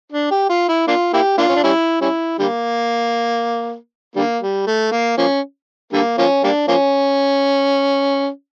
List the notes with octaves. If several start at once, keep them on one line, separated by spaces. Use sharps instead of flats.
D4
G4
F4
E4
A#3 D4 F4
A#3 E4 G4
A#3 D4 F4
C#4
D4
G3 C#4 E4
G3 C#4 E4
D3 G3 A#3
D3 G3 A#3
G3
A3
A#3
F3 A#3 C#4
D3 G3 A#3
F3 A#3 C#4
G3 A#3 D4
F3 A#3 C#4